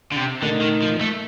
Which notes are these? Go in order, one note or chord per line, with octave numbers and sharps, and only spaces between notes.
D3
C3
A#2 D3 A3 D#4 A#4 D#5
D#3
F3
A3